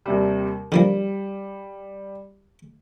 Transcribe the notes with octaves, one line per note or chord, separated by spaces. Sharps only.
D#2 C3 G3
D3 F3 G3 A#3